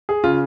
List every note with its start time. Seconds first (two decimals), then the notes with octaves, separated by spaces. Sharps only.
0.09 G#4
0.24 C#3 F4